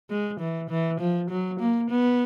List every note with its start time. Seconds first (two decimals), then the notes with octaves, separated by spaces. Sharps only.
0.10 G#3
0.40 E3
0.70 E3
1.00 F3
1.30 F#3
1.60 A#3
1.90 B3